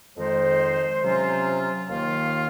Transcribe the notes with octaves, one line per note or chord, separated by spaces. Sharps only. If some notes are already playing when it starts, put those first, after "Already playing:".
F2 D#3 G#3 D#4 C5
C3 F#3 C#4 F4
D#2 D#3 A#3 F4 F5